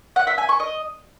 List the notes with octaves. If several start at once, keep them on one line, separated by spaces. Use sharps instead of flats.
F#5
E5
G#5
C#6
D#5